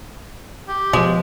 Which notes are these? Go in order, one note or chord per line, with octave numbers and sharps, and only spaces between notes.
G4
B2 F3 G#3